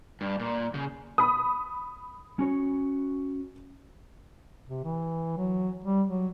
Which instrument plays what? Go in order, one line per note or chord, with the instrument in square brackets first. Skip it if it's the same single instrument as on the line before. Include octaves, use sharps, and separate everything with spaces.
[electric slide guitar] G2
A#2
C#3
[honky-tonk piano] B5 D#6
[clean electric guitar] C#4 F#4 C#5
[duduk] C3
E3
F#3
G3
F#3